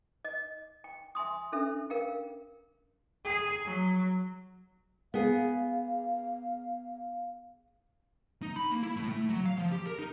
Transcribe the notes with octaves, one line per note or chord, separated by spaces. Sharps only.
D#5
G5
E5 G#5 C6 D#6
C#4 D4 A4 E5
A#4 F5 G5
G#4
F#3
B3 G#4 F5
D#4
B5
A#3
E4
A2
A3
F#3
F5
F3
G4
A#4
D#4